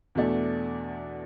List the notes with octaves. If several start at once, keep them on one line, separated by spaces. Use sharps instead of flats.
E2 B2 A3 D4